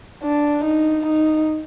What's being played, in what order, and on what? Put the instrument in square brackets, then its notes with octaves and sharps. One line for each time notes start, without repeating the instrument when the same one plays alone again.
[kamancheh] D4
D#4
D#4